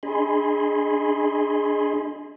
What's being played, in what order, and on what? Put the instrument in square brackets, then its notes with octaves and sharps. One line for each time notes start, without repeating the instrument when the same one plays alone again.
[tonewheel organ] D4 G#4 D#5 G#5 B5 C6